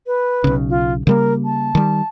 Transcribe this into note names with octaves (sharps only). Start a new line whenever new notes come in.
B4
B1 C#3
F4
C#3 G3 A#3 A#4
A5
D#3 G3